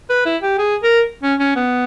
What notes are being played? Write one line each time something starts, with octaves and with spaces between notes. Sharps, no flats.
B4
E4
G4
G#4
A#4
C#4
C#4
B3